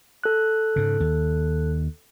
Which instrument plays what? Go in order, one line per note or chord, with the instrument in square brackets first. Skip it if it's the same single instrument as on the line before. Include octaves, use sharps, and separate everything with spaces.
[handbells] A4 F#6
[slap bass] G#2 C#3
D#2